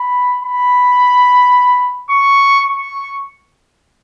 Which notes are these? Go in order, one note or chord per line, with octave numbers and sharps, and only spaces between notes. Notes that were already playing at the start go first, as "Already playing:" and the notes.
Already playing: B5
B5
C#6
C#6